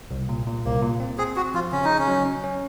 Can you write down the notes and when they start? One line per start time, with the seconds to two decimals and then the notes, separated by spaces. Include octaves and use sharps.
0.11 C2
0.29 A#2
0.47 A#2
0.65 C2 A#3
0.82 A#2
1.00 C4
1.18 C4 G#4
1.36 C4 F#4
1.54 F3 F4
1.72 C#3 C#4
1.84 D#4
1.90 C#3
1.99 C#4
2.08 F#3
2.26 C#4
2.44 C#4